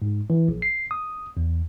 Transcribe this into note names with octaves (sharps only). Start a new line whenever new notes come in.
G#2
E3
A#1
C7
D#6
E2